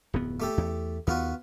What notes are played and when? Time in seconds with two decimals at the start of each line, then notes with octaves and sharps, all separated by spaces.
0.14 D1 F2 B3
0.40 A3 G4 A4
0.57 E2
1.07 D#2 B3 F4 F#4